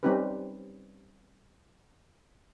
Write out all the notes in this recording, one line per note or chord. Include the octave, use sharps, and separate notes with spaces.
G3 C4 C#4 D#4 G4 B4